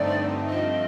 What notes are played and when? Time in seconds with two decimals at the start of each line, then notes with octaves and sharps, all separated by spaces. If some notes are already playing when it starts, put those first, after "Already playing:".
Already playing: G2 D3 A3 C4 D#4 D5
0.48 G2 F3 A3 C4 D#5